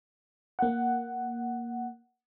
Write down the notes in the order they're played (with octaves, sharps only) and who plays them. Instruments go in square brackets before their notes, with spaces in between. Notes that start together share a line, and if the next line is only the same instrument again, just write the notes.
[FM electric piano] A#3 F#5